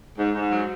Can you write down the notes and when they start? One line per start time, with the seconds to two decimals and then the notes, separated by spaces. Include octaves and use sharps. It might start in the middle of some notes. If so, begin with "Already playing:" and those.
0.19 G#2
0.35 G#2
0.52 F#3